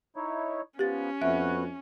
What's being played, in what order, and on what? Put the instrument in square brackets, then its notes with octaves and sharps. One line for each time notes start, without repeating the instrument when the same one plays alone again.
[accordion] D#4 E4 C#5
[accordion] F3 B3 [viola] C#4 [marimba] G4 A6
[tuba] F2 [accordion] B3 F#4 F#6 [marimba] E5